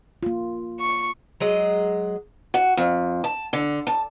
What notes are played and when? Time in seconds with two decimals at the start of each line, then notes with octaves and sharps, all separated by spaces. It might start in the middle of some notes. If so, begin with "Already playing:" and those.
0.23 A#3 F4
0.79 C#6
1.40 F#3 G#3 D#5
2.54 F#4
2.77 F2
3.24 A5
3.53 D3
3.87 A5